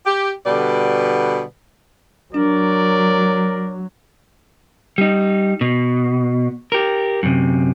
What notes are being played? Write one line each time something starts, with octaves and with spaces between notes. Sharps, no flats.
G4
B2 D3 G3 B4 D5
F#3 D4 A#4 D5
G3 D#4
B2
G4 A#4
F#2 C3